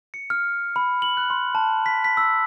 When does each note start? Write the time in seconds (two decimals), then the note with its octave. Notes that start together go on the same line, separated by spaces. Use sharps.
0.14 C#7
0.30 F6
0.76 B5
1.02 F#7
1.17 F#6
1.30 C6
1.55 A5
1.86 B6
2.05 B6
2.17 E6